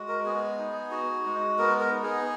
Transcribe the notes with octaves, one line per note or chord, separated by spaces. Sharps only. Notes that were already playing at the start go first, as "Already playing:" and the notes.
Already playing: G#3 F#4
A#4
B3 G#4
D#4
F#4
G#3
B3 A#4
A#4
D#4
G#4